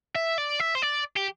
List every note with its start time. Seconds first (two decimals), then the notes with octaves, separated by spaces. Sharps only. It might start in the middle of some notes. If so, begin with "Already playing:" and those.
0.15 E5
0.38 D5
0.60 E5
0.75 C5
0.82 D5
1.17 G4